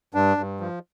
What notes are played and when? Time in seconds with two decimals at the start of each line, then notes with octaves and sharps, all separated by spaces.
0.14 G2 D4
0.37 G2
0.60 F3